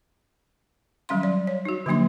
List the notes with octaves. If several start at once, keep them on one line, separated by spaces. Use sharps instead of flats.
D#3 F#3 G3 C#4 F5 C6
D5
C#5
D#4 F#4
D3 F3 F#3 A#3 D4 C6